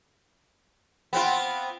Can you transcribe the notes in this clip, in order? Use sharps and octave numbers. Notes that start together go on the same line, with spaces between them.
B3 C4 F4